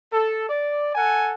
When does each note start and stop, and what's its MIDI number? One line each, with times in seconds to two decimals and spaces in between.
0.12 0.47 69
0.48 0.90 74
0.94 1.34 69
0.94 1.34 78
0.94 1.34 80